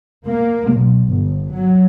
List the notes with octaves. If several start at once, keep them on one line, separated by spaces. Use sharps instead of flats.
A#3
B1
G1
F#3